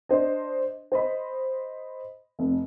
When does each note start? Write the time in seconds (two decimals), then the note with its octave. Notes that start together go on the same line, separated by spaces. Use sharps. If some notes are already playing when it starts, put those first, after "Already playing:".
0.09 D4 C5 D#5
0.92 C5 D#5 B5
2.39 F1